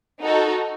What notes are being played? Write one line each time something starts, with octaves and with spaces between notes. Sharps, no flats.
D#4 F#4 A4